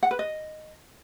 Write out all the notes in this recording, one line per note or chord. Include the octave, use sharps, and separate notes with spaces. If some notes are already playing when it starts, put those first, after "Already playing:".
F#5
B4
D#5